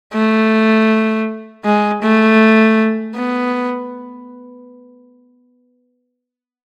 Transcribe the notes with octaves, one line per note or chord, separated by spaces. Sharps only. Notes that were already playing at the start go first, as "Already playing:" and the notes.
A3
G#3
A3
B3